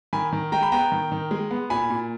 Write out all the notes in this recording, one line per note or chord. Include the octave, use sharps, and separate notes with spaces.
D#3 G#5 B5
D#3
G#3 G5 A#5
B5
B3 G5 A#5
D#3
D#3
G#3
B3
A#2 G#5 B5
A#2